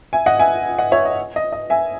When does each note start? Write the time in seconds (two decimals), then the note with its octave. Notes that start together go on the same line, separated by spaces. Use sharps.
0.13 E5 G#5
0.26 D#5 F#5
0.39 E5 G#5
0.78 D#5 F#5
0.92 C#5 E5
1.05 D#5
1.36 D#5
1.52 D#5
1.70 E5 G#5